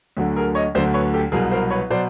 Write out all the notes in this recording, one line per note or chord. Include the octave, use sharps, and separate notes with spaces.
D2 D3 F#3
G#4 A#4
C#5 D#5
D2 D3 F#3 C5 D5
B4 C#5
G4 A4
C2 B2 F#3 G#4 A#4
A#4 C5
B4 C#5
B2 F#3 C5 D5